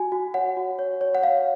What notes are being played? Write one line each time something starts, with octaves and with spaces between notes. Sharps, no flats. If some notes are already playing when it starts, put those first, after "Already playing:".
Already playing: F#4 G#5
F#4
C#5 F#5
F#4
C#5
C#5
F#5
C#5 F5